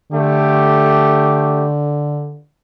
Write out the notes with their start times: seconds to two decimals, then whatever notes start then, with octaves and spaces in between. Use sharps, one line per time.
0.12 D3 A3 G4